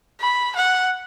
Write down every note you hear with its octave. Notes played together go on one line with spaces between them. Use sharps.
B5
F#5